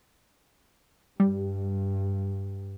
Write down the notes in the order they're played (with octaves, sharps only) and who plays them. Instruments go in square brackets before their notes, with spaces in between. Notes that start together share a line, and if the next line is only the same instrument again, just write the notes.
[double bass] G2 [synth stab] G3